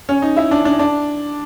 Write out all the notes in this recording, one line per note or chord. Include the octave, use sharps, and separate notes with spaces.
C#4
D#4
E4
D4
D4
D4